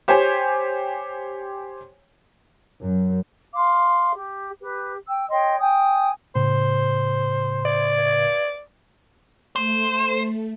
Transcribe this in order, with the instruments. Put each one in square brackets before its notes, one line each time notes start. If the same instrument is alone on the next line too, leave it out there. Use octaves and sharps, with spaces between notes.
[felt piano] G4 C5 C#5 G5 G#5
[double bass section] F#2
[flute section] F5 C6 D6
G4
G4 B4
G5 E6
C#5 D#5 G5 C6
G5 G#5 D#6
[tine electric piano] A2 C#3 [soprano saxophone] C5
[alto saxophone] D5
[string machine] A3 [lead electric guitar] C5